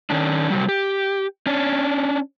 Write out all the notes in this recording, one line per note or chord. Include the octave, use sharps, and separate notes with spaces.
D#3 C#4 D4
C3 F#3 G3
G4
C#4 D4